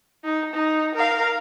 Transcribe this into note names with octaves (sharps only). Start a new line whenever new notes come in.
D#4
D#4
A#4 F5